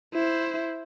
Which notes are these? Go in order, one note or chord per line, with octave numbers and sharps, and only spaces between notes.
E4 C5